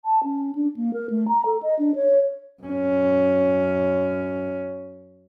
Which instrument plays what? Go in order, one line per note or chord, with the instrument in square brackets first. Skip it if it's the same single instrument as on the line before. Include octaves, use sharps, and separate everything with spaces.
[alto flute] A5
C#4
D4
A#3
A#4
A3
A#5
A4
D#5
D4
C#5
[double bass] F#2 C#4